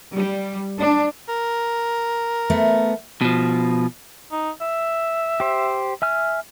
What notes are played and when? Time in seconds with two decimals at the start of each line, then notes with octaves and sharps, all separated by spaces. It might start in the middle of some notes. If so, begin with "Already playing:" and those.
0.14 G3
0.79 D4
1.29 A#4
2.50 A3 B3
3.21 B2 F3
4.32 D#4
4.61 E5
5.40 G4 C5
6.02 E5 G#5 F6